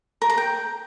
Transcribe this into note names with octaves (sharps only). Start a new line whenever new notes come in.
A#4
A#5
G5